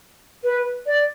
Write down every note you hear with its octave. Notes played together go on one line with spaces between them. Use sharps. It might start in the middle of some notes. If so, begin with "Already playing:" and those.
B4
D5